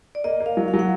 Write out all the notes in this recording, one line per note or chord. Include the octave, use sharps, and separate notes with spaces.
D5
A#3 D#5
A#3
F5
F#3
F5
F#3
F#5